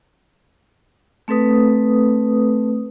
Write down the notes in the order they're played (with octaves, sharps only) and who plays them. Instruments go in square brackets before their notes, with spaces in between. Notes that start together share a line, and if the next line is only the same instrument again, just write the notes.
[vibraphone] A3 C4 A4 B4 D#6